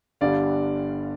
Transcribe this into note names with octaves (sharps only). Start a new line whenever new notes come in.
G1 G2 D3 G3 D5 F5